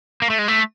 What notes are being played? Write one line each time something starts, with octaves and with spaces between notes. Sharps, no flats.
A#3
A3
G#3
A3